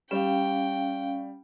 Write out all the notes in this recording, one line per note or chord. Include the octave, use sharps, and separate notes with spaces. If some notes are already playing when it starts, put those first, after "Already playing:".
G3 C#4 F5 G5